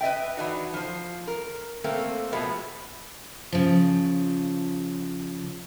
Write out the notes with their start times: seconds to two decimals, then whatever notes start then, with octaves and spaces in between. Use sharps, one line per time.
0.01 B4 D#5 E5 G5
0.37 E3 D4 D#4 F#4
0.74 F3 C5
1.28 A#4
1.84 A3 A#3 C4
2.32 B2 F3 G#3 A3 B3
3.52 C#3 F3